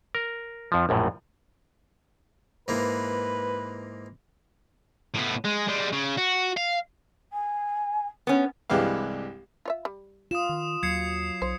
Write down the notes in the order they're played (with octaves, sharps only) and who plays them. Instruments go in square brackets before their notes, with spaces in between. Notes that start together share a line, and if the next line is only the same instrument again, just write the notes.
[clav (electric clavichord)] A#4
F2 F3
A#1 F#2 A2
[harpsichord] G#2 E3 A#3 [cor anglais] B4
[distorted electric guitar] A2 B3
G#3
G3 G#3
C#3
F#4
F5
[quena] G#5
[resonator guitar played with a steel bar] B3 C#4
[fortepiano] C2 G2 E3 G#3 G4 F5
[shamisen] F4 C#5 E5
G3
[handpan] F4 [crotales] D#6 E7
[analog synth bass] D#3
[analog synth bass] D#2 [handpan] F#3 [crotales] G#6 C7 C#7
[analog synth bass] B1 [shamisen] C5